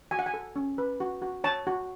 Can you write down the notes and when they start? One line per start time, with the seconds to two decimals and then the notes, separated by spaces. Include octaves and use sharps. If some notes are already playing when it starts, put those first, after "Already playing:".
0.11 F#4 G#5
0.19 F#5
0.26 G#5
0.34 A4
0.56 C#4
0.78 B4
1.00 F#4
1.22 F#4
1.44 C#5 A5
1.67 F#4